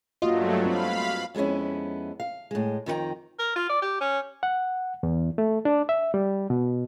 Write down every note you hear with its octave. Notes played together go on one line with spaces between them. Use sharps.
G2 F#3 A3 A#3 F4 F#4 D#5
C4 F5 B5
F2 G#3 B3 C#4 E4
F5
A2 G#3
F2 D#3 E4 G5 A#5
A#4
F4
D5
G4
C#4
F#5
E2
A3
D4
E5
G3
B2